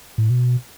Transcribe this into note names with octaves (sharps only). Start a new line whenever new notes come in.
A2
B2